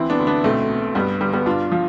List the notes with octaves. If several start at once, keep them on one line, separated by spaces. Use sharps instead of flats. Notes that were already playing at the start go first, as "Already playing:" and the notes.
Already playing: D2 E3 C4 E4
B3 D4
D2
B3 D4
B1 A3 C4
B2
G2 G3 B3
G1 G3
G3 B3
G2 D4 F4
F3